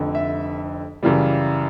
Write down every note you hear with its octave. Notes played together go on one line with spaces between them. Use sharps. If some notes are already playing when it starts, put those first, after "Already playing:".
Already playing: F1 F2 D3
E5
F#2 C#3 E3 G3